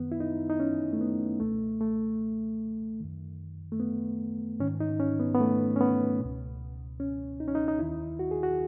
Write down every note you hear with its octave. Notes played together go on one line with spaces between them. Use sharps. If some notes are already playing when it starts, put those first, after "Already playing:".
Already playing: F#2 D#3 B3
E4
D#4
D#4
C#4
A3
B3
C#2 B2 A3
A3
F#2 D#3
A3
B3
G#2 D#3 C#4
D#4
C#4
B3
B3
A3
C#4
B3
C#2 B2
C#4
D#4
C#4
D#4
D#4
D#2 D#3 E4
F#4
G#4
F#4